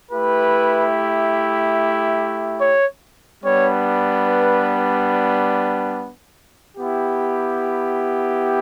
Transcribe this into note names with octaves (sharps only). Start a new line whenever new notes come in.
A3 E4 G4 B4
C#5
G3 B3 D4 C#5
B4
B3 E4 G4